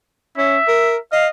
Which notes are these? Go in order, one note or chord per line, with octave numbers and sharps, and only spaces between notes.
C#4 E5
A#4
D#5 F5